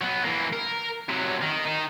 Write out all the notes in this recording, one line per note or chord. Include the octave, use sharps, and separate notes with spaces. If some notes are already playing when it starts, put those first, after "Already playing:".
F#3 B3
E3 A#3
A#4
C3 F#3
D#3
D#3 D#4